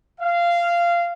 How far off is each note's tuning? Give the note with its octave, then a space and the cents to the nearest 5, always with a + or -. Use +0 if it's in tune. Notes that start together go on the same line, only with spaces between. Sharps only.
F5 -15